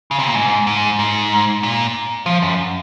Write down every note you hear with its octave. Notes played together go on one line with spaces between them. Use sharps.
C#3
C3
A#2
G#2
G#2
G#2
A#2
F3
F#2